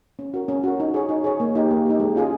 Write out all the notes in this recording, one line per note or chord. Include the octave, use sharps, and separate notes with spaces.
C#4
F#4 A#4
C#4
F#4 A#4
D#4
G#4 C#5
D#4
G#4 C#5
A#3
D#4 G4
A#3
D#4 G4
G#3
C#4 F4 G#4